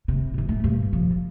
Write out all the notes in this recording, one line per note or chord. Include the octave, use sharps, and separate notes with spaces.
C3
G#1 E3
G#2 A3
G2 A#2
C3 F3
F2